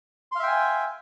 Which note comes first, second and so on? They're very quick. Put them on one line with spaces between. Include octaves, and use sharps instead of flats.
C6 F5 E5 G5 G#5